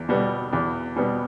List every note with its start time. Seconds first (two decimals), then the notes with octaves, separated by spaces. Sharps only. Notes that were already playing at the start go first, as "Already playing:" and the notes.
Already playing: E2
0.09 B2 G3 B3
0.53 E2
0.96 B2 G3 B3